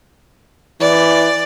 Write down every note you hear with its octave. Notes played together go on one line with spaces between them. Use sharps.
E3 D5